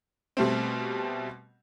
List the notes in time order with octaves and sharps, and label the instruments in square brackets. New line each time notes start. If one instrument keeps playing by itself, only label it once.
[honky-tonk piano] B2 G3 A3 C4